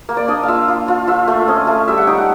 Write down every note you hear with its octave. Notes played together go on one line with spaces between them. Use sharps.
A#3
D5
D4 D#5
F5
F4 E5
F4
F4
F4 E5
A3
C#4 D#5
A3
G3 E5
F#5
D#4 G5
F#5